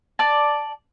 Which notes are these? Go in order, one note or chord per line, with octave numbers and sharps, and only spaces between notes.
D5 A5